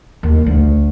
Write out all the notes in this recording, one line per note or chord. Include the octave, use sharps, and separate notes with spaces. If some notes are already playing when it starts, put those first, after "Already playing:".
D#2
D2